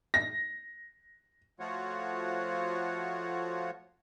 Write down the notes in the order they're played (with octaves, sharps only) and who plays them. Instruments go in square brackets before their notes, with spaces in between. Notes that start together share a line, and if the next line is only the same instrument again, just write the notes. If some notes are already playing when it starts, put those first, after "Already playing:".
[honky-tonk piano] A#6
[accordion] F3 A3 F4 F#4 C#5 F#5